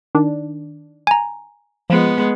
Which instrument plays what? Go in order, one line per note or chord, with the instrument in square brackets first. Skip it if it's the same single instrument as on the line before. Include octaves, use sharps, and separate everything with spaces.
[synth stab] D#3 D4
[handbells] G#5 A#5
[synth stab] F3 [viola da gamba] G#3 B3